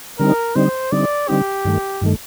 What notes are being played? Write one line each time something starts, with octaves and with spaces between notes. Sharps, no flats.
D3 G3 C4 D#4 A#4
D3 G3 C4 D#4 C5
D3 G3 C4 D#4 D5
D3 G3 C4 D#4 G4
G2 D#3 A3
G2 D#3 A3